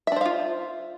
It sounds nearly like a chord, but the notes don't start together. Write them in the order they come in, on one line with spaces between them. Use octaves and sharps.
E5 D4 C5 F5 F4